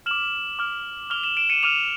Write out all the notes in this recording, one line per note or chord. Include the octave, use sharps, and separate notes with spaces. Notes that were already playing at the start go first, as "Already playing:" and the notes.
D6 F6 E7 F#7
D6 F6
D6 F6 F7 G7
E7 F#7
D7 E7
C#7 D#7
D6 F6 D#7 F7